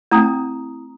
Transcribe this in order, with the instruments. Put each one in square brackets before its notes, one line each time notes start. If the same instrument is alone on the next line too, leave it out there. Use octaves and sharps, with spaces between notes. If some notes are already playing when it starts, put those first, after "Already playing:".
[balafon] A3 C4 [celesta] E4 A#5 D#6